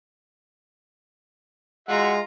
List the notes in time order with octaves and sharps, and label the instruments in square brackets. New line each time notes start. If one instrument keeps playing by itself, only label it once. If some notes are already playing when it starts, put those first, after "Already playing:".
[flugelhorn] G#3 [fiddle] F4 A#5 [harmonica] F#4 E5 F#5